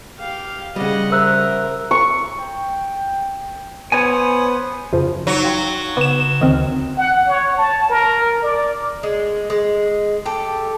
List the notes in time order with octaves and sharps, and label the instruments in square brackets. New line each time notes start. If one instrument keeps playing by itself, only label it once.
[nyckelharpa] G4 F5
[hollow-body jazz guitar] C#3 G3 [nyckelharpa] D#5 F#5
[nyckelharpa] A#4 [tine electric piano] C5 E5 A#5 [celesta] E6 F#6
[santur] C#6
[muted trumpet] G5
[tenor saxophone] B3 [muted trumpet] C5 [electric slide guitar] C#5 G#5
[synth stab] F#2 C#3 F3
[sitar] F#3 [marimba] D#4
[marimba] F5 G5 C6
[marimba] C#3 [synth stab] B3 E7
[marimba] D2 D3 [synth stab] D#3 C4
[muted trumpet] F#5
C#5
A5
A#4
D5
[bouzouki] G#3
G#3
G4 A4